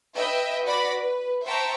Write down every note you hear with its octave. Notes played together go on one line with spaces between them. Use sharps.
B4 D#5 E5 G5
F#4 B4 D5 B5 A#6
B4
C5 E5 G5 A5 A#5 C#6